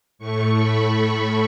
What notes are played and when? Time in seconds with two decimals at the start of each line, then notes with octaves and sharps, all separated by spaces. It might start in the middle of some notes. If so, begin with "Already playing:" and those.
0.19 A2 A3 C#6
0.56 B5
0.94 B5